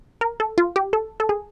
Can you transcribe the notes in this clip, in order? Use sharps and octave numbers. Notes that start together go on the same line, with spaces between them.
A#4
A4
F4
G4
A4
A4
G#4